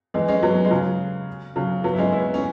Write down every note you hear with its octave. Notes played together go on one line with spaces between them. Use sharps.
E3 G#3
G#3 C#4
F#3 B3
G#3
C#3 F#3
C#3 F#3
F#3 B3
E4
G#3 C#4
B3 E4
C#4